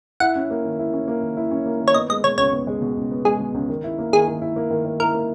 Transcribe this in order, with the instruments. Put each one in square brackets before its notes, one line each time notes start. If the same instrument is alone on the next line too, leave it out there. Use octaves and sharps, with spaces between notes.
[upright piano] E4 [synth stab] F#5
[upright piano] C#4
A#3
D#3
E4
C#4
A#3
D#3
E4
C#4
A#3
D#3
[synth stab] C#5
[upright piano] B3 [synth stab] D#5
[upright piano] G#3 [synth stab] D#5
[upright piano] B2 [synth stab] C#5
[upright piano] C#2 [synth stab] C#5
[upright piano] B3
G#3
B2
C#2
B3
[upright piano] G#3 [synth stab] G#4
[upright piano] B2
C#2
D#3
E4
A#3
[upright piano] D#3 [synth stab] G#4
[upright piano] D#3
E4
A#3
D#3
D#3
[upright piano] E4 [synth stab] A#4
[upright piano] A#3